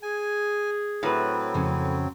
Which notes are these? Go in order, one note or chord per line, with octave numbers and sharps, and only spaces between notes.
G#4 G#5
A2 F#3 C4 B4
F2 C#3 C#4